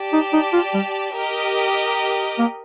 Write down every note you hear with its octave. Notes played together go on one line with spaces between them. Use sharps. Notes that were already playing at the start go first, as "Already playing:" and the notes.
Already playing: G4 D5 A5
D#4
D#4
F4
G3
G4 A#4 D#5
A#3